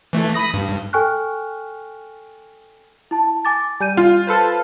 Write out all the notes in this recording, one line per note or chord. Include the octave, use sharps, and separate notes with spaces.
E3 A3
B5 D#6 A#6
G2
A4 G5 G#5 C#6 F6 F#6
E4 A5
G#5 D6 A6
G3 G#5 G6 D#7
F4
A4 B4 C5